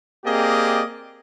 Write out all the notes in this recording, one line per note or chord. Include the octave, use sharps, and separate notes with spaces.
A#3 C4 G4 G#4 D5 D#5